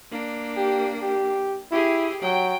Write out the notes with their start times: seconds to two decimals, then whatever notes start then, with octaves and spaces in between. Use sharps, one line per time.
0.11 A#3 D4
0.57 G4
1.02 G4
1.71 E4 G4 G#4
2.22 F#3 G5